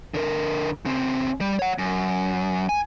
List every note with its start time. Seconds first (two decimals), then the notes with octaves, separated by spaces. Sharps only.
0.14 D3 A#4
0.85 C#3 C4
1.41 G3
1.59 C#5 F#5
1.78 F#2
2.69 G#5